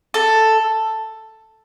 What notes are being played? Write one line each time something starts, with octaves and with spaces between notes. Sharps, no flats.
A4